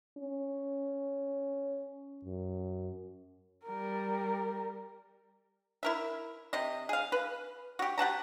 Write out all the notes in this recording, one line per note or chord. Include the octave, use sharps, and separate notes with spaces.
C#4
F#2
G3 A#4
E4 A#4 E5
C3 D#5
G#4 F5
B4
F#4 G4
G4 F#5 A5 A#5